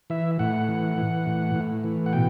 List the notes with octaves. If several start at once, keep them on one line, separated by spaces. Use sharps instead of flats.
E3 E5
A2 F#5
E3
E3
A2
A2
E3
F#5
B2 G5